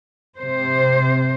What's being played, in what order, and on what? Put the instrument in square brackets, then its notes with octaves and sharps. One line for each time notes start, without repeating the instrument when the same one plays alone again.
[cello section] C3 C5